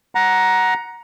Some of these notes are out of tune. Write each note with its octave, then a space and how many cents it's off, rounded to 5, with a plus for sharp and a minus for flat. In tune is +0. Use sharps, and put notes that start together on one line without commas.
F#5 +0 A#5 +15